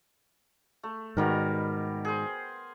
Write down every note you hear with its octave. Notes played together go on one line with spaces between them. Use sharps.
A3
G#2 B2 D#3 G3 A#4
G#4 C5